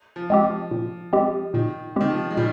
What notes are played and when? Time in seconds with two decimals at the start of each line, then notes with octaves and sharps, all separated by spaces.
0.16 F3
0.30 G#3 C4 G4
0.44 F3
0.71 A#2
1.13 G#3 C4 G4
1.54 A#2 D#3
1.96 D#3 G#3 C4 G4
2.10 F3
2.30 G#3
2.37 A#2 D#3 G3